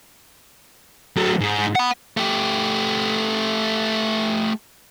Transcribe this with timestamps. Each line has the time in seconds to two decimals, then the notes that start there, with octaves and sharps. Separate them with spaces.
1.17 F#3 A3
1.40 G#2
1.75 F#5 B5
2.17 A3 G4